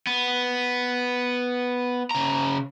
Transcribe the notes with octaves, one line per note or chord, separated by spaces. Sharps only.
B3
C#3 A#5